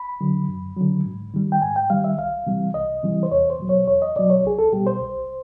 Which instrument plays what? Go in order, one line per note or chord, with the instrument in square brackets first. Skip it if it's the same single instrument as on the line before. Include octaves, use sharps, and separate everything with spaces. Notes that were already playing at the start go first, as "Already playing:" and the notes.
Already playing: [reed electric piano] B5
D3 F#3
F#2
D3 F#3
G#2
D#3 G3
G5
G#2 G#5
G5
D#3 G3 F5
E5
C2 F5
C3 E3 G3
C2 D#5
C3 E3 G3
C5
E2 C#5
C5
B2 F#3
C#5
E2 C#5
D#5
B2 F#3 D5
C#5
C2 G#4
A4
B2 G3 G4
C5
C2